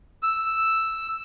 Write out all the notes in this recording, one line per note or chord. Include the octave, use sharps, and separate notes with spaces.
E6